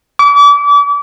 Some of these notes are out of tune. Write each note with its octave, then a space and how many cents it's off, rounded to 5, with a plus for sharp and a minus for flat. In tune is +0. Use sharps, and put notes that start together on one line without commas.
D6 -35